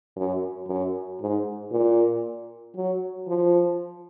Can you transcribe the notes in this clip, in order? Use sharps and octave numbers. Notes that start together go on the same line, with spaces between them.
F#2
F#2
G#2
A#2
F#3
F3